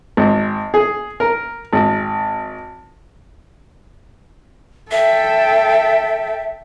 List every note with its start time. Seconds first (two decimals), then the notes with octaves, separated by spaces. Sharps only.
0.17 G#1
0.74 G#4
1.20 A#4
1.73 G#1
4.92 A4 E5 G5